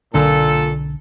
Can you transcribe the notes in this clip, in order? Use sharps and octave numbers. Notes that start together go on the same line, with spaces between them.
B1 A#2 D3 D4 A4